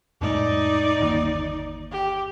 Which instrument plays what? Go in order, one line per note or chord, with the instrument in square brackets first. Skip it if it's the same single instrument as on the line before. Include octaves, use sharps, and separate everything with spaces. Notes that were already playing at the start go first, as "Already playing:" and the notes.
[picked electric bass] F2 A2 G#3 [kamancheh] D#4 D5
[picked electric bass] G1 D#2 A#3
[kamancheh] G4